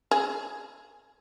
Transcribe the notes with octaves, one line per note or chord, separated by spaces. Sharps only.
G#4